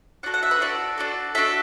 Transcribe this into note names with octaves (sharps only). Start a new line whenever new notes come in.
D4 F#4 A4 F#5
F#5
E5
B4
D4 F#4 A4 D5
D4 F#4 A4
D4 F#4 A4 E5